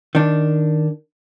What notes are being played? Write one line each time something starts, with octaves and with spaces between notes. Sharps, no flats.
D#3 D4